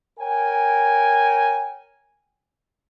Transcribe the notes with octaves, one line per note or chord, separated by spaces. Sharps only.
A#4 C#5 G5 G#5